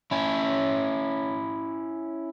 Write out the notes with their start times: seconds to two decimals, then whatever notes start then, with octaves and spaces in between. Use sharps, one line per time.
0.11 C#4 E4